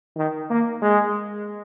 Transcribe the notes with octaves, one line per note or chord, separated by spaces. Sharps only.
D#3
A#3
G#3